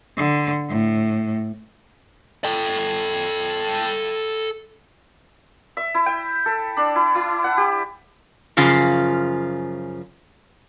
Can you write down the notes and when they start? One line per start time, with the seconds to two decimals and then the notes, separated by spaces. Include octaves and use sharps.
0.17 D3
0.69 A2
2.45 A4 G5
5.77 E5
5.94 E4
6.06 G5
6.46 A4
6.77 D4
6.96 E4
7.15 E4
7.44 F#5
7.57 G4
8.57 F#2 C#3 F3 F4